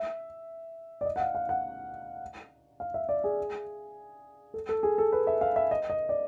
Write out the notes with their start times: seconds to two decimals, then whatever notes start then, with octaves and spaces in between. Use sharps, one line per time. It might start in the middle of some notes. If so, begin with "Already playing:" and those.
Already playing: E5
1.01 D5
1.05 D#5
1.16 F#5
1.20 F5
1.35 F5
1.49 F#5
2.80 F5
2.94 E5
3.09 D5
3.24 G#4
4.54 A4
4.69 A4
4.83 G#4
4.98 A4
5.12 B4
5.27 E5
5.41 F5
5.56 E5
5.71 D#5
5.90 D#5
6.09 D5